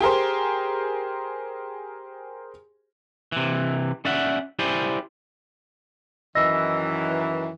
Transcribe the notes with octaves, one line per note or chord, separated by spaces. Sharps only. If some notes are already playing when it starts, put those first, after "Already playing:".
G4 G#4 A#4 C5
C3 E3
C#4 D5 E5 F#5
E4 G4 C5 D5 G#5
F#2 D#3 E3 D#5 E6 A#6